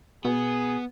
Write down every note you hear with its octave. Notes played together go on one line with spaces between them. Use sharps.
B2 B3 G#4